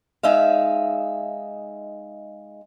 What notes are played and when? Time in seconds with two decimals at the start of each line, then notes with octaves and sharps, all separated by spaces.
0.23 G#3 D#4 E5 F5